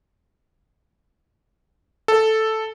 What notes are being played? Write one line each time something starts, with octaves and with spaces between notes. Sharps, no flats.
A4